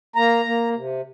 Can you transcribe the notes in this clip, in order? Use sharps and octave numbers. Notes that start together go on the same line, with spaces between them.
A#3 A#5
A#3
C3